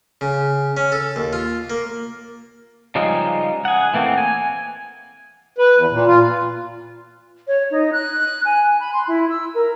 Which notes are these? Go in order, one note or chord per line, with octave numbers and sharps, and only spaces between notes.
C#3
C#4
A4
D#2
F4
A#3
C#3 F3 G3 G#3 D#4
G#4 F#5
E3 A3 A#3 C4
G#5
B4
E2
A#2
F4
C#5
D#4
F#6
G#5
B5
C6
E4
E6
A#4